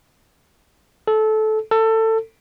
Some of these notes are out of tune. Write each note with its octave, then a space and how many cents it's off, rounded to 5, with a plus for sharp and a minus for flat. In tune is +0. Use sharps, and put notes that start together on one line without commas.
A4 -20
A4 +20